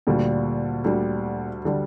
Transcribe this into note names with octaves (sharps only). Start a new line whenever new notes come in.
D2 A#2 D3 G3
D2 D3 G3
D3 G3